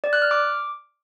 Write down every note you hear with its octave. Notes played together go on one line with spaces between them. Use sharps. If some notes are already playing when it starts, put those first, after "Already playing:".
D5
F#6
F6
D6